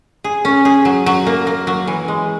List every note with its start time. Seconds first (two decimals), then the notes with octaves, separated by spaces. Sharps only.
0.24 G#4
0.45 C#4
0.65 G#4
0.85 F#3
1.06 F#3
1.27 A#3
1.47 A#3
1.67 F#3
1.87 E3
2.08 G#3